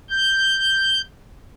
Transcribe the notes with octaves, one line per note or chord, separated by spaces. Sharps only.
G6